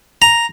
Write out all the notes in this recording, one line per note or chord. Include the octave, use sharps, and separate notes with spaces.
A#5